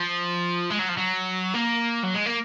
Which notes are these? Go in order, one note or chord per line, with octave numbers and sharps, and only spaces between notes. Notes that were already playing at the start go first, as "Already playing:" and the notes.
Already playing: F3
G#3
F#3
F3
F#3
A#3
F#3
G#3
A#3